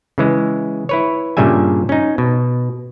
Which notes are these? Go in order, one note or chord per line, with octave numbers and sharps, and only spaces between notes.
C#3 E3 G#3
E4 B4 C#5
G2 A#2 C#3 G3 E5 G#5
C#4 D#4
B2